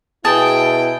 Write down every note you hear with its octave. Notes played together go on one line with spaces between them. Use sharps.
B2 E4 G#4 G5 A5